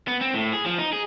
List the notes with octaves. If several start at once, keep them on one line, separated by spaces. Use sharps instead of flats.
B3
C4
A2
G#4
F3
D#4
G#4